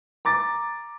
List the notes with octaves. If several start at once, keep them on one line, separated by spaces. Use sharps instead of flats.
A#5 D6 A6